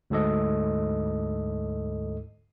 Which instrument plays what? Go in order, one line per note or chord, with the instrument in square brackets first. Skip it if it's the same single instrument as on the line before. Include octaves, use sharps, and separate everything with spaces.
[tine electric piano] D2 G#2 A4 D#5